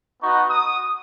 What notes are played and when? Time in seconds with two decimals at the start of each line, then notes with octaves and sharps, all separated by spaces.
0.21 B3 D#4 F#4 C#6
0.50 D#6